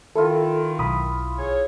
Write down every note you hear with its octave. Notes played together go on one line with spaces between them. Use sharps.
D#3 E4 F4 A4
B1 B5 D#6
G#4 C#5